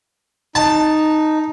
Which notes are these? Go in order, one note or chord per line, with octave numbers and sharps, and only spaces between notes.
D#4 A5